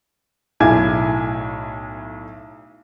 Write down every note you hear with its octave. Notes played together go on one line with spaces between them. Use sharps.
B1 A2 E4 G#5 D6 G#6